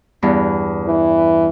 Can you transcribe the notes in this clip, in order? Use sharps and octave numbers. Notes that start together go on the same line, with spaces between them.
E2 G2 G3
E3